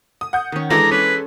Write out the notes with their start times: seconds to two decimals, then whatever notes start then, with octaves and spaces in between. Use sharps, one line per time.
0.21 D#6
0.33 F#5 G6
0.52 D#3 C#4
0.70 E3 G#3 D4 A4 D5 A#5
0.91 C#4 B4